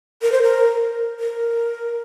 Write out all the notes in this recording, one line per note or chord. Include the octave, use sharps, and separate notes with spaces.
A#4
C5
A#4
A#4